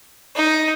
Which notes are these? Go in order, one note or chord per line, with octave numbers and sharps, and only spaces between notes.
D#4